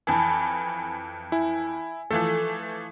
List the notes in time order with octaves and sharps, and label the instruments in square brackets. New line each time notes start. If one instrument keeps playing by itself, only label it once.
[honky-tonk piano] F2 E3 [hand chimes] G#5 A5 B5
[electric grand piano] E4 [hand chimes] G#5
[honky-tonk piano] E3 F3 A3 [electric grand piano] A4